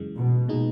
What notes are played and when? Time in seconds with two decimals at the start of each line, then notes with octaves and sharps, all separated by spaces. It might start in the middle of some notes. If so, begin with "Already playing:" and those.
Already playing: F#2 C#3 E3 G#3
0.16 B2
0.48 A#2 G#3 D#4